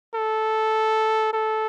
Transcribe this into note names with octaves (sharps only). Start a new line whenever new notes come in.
A4
A4